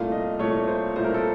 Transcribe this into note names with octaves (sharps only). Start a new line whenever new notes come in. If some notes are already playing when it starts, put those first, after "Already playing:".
Already playing: C2 A#2 A3 F5
D#5
C2 A#2 A3 C#5
C5
C2 A#2 A3 C5
A#4
A4